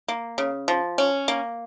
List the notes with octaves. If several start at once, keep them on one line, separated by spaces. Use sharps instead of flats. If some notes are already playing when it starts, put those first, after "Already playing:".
A#3
C#3
F3
C#4
A#3